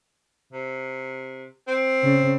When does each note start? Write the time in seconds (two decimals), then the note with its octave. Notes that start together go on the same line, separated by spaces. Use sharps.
0.53 C3
1.68 C4
2.03 C#3